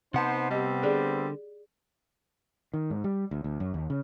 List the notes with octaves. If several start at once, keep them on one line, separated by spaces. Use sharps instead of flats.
C3 B3 D#4 C5 F#5 A5
G3 B3 C4 G4 D#5
D3 G#4 D5
D#3
G#2
G3
D2
D2
F#2
D#2
C#3